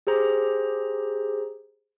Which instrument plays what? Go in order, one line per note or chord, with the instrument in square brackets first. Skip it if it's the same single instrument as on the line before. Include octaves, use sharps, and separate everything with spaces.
[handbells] G4 G#4 C5 A#5